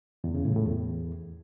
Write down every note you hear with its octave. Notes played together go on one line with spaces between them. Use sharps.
E2
C#3
A2
A2
E2